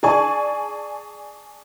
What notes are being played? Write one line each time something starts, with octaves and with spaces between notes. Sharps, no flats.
G#4 D5 G#5 A5 C#6